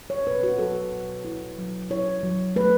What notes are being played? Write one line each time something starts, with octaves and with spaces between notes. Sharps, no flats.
C#5
B2 B4
F#4
F#3 A4
B2
E4
F#3
E4 C#5
F#3
A3 B4